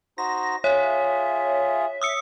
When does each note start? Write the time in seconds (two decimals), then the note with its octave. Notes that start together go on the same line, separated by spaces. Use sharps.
0.18 D#4 F#4 C5 A#6
0.64 F4 G#4 C#5 E5
2.02 D#6 E6 C#7